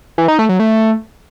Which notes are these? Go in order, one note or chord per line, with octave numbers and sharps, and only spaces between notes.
E3
D#4
A3
F#3
A3